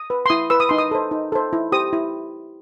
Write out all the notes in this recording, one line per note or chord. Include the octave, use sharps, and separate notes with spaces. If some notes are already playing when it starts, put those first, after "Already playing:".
Already playing: D#6
B4
C6
E4 D#6
B4 E6
D#6
D#4 C6
D#6
A4 C5
D#4
A4 C5
E4
G4 C5 D#6
E4